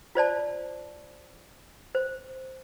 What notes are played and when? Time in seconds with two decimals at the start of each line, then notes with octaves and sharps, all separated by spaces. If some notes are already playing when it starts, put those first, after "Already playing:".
0.15 F4 C5 D5 A5
1.95 C5